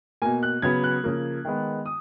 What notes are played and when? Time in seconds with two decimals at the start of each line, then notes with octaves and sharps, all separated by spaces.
0.22 B2 A#3 G#5
0.43 F#6
0.62 C#3 F#3 B3 G#6
0.84 F#6
1.04 C#3 F3 A#3
1.45 D#3 G#3 B3
1.86 D#6